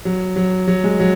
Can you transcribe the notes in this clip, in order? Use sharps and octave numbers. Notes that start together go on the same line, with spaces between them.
F#3
F#3
F#3
G#3
F#3